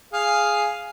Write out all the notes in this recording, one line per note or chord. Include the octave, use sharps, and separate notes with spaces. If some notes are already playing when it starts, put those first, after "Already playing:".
G#4 F5